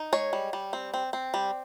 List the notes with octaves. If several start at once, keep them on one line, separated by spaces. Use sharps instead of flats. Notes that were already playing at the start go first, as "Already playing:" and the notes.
Already playing: D#4
G#3 C#5
G3
G3
C4
C4
C4
G3